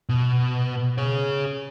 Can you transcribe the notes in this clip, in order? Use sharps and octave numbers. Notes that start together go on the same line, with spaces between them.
B2
G#4 C#5